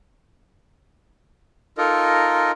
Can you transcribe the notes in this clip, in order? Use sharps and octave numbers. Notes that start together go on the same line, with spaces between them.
D#4 F4 A4 A#4 D#5